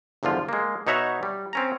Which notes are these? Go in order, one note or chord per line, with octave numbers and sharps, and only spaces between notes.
G1 E2 D3 F3 F4
G#3 A#3
B2 D#4 C#5 E5 F#5 A#5
G3
C4 C#4 A#5